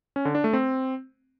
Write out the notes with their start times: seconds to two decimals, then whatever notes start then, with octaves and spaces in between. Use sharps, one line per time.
0.16 C#4
0.25 D3
0.35 D4
0.44 A3
0.53 C4